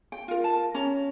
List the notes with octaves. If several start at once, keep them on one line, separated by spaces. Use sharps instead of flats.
G5
F4 A#4
A5
C#4 A#5